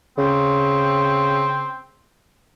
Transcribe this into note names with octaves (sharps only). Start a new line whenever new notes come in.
C#3 C4